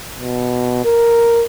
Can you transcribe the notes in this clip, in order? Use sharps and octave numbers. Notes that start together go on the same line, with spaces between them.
B2
A#4